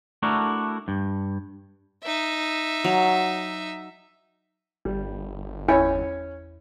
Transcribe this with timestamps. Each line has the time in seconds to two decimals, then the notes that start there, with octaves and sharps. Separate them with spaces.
0.23 A3 D4 E4 F#4 A4 A#4
0.88 G2
2.03 D#4 E5
2.84 F#3
4.85 G1 G3
5.69 E2 C#4 E4 C#5